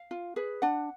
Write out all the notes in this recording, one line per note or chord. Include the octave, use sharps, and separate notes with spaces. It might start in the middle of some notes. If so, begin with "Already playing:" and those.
Already playing: F5
F4
G#4 B4
D4 F#5